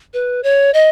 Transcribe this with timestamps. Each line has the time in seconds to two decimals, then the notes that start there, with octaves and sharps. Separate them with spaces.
0.14 B4
0.43 C#5
0.74 D#5